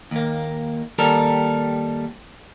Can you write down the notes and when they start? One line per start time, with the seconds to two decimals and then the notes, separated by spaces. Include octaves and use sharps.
0.11 D#2 A#3
0.98 D#2 G3 A4 A#4